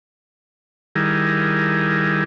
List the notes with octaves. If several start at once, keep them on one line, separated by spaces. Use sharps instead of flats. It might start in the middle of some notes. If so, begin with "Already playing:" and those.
D#3 G3 E4 G#4 A#4